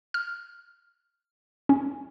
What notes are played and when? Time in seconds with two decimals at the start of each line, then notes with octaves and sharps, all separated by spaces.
0.14 F6
1.69 C#4